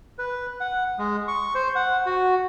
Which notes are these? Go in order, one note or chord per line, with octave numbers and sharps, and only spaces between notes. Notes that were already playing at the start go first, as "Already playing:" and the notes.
B4
F#5
G#3
C#6
C5
F#5
F#4